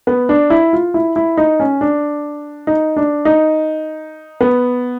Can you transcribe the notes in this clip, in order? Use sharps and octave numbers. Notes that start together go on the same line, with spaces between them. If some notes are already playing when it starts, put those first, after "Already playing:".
B3
D4
E4
F4
E4
E4
D#4
C#4
D4
D#4
D4
D#4
B3